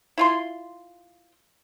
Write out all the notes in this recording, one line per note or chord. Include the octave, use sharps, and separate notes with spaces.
E4 F4 C6